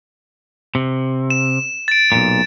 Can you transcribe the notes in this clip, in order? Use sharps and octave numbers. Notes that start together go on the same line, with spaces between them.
C3
E7
A6 D7
B1 A#2